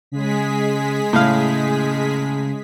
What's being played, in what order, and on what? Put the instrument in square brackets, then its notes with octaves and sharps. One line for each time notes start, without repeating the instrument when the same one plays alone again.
[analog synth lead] C#3 [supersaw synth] G#3 G#4 B6
[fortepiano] A2 F5 [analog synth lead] C#3